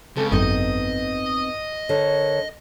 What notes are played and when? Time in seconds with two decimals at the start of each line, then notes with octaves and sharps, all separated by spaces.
0.16 C#2 C#3 C4 A4
0.32 G#1 F#2 B3 C4 D#4 D#5
1.89 D3 A#4 C5 C#5